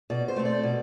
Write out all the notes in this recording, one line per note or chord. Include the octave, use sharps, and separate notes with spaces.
B2 D5
C5
A3 C4
D5
B2